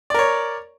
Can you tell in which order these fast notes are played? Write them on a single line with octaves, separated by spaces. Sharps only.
D5 A#4 C#5